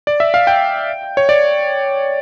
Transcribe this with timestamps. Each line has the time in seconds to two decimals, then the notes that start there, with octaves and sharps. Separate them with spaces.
0.07 D5
0.20 E5
0.34 F5
0.47 G5
1.17 C#5
1.29 D5